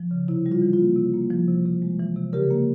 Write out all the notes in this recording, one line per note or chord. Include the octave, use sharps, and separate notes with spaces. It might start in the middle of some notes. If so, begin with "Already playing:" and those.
Already playing: F3
C#3
C3 E4
G3
F4
E3
F4
A#3
C3
A#3
F3
C3
C3
G#3
E3
C3
C#3 G4 A#4
A#3